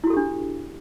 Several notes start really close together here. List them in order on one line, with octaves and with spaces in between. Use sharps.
E4 F#4 A4 G4 D4